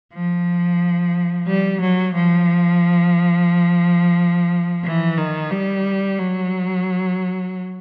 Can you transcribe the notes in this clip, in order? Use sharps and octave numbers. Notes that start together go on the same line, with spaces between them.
F3
G3
F#3
F3
E3
D#3
G3
F#3